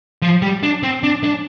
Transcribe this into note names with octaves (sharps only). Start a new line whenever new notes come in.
F3
G3
D4
C4
D4
D4